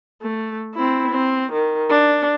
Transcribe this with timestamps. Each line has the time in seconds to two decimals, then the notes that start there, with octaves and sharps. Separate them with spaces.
0.22 A3
0.75 C4 E4
1.11 C4
1.52 D#3
1.90 D4